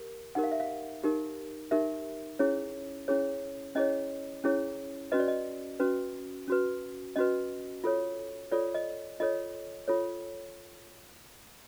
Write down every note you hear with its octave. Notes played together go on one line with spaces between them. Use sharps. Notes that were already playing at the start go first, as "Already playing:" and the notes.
Already playing: G4 A#4
D#4 G4 A#4 F#5
F5
E5
F5
D#4 G4 A#4
D#4 G4 A#4 E5
C#4 E4 G#4 C#5
C#4 E4 G#4 C#5
C#4 E4 G#4 C#5 D#5
C#4 E4 G#4 C#5
C#4 F#4 B4 D#5
D5
D#5
C#4 F#4 B4
C#4 F#4 B4
C#4 F#4 B4 D#5
F4 A4 C#5
F4 A4 C#5 D5
D#5
F4 A4 C#5 D#5
F4 A4 C#5